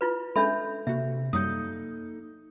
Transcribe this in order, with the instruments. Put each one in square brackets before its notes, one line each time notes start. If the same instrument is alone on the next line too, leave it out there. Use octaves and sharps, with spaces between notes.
[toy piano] E4 F4 B4
[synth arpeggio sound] G#3 C#4 [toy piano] D4 E5 B5 [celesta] A4 G6
[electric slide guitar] C3 [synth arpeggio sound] A#3 F#4 [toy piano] E5
[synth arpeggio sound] F#2 F#3 G3 [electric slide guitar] A#3 D#4 A4 [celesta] D#6 G6